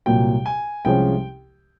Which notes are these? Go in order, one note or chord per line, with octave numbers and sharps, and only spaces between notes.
C2 A#2 F#3 G5
G#5
C2 C3 F3 G#3 C#4 G5